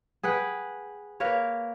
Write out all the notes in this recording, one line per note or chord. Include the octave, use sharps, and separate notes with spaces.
G#4 B4 F#5 G5
A#3 A#4 B4 C#5